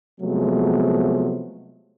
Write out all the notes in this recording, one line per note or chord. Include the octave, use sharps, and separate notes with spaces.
C3 F3 F#3 G#3 A3 B3